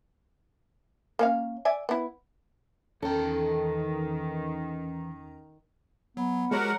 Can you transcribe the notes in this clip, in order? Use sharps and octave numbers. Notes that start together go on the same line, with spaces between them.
A#3 C#4 F5
D5 E5 G#5
B3 E4
E2 D#3 E3 C#4 A4 G5 A#5
F#3 B3
F3 G#3 F#4 G4 A#4 C#5 F#5